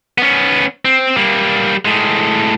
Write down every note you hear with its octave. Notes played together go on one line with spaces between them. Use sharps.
B3 C#4
C4
G3 A#3
A2 G#3